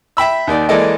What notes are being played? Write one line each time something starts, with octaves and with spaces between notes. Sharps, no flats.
E5 G5 B5 E6
D#2 D#3 D5
E3 G#3 A#3 A4 D5 D#5